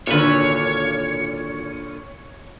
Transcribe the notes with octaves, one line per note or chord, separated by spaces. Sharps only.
G#1 A#2 D3 B4 C#5